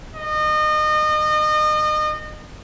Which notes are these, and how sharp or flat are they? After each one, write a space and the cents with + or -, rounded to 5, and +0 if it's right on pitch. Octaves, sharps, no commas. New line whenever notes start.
D#5 -30